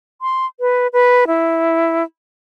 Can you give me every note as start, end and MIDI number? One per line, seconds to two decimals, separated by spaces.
0.22 0.46 84
0.60 0.87 71
0.93 1.24 71
1.27 2.03 64